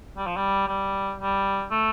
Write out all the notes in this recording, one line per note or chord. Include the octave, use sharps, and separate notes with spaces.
G3
F3
G3
G3
G3
A3